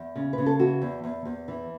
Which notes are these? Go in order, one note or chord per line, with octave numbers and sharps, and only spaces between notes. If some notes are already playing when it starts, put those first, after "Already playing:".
Already playing: E2
C#3
C#3 B4
A4
E3 F#4
E2
E2
E2
E3